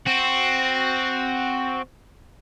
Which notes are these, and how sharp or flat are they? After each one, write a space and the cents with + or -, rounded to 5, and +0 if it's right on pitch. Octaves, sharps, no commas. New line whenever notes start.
C4 +0 F#4 +0